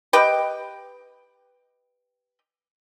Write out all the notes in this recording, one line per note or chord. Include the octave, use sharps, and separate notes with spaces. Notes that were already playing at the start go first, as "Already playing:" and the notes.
G4 B4 D#5 G5